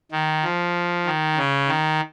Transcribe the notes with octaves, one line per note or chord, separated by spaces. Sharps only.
D#3
F3
D#3
C#3
D#3